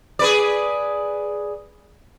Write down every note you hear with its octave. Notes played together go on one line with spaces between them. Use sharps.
G#4 B4 D5